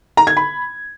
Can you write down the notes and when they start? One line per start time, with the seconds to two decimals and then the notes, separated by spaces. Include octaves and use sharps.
0.17 A#5
0.27 G#6
0.37 B5